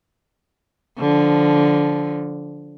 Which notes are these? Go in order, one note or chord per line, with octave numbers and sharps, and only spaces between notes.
D3 F3